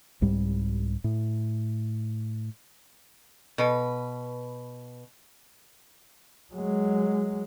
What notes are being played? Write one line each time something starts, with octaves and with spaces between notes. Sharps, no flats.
C2 G#2 G3
A2
B2 B4
F#3 G#3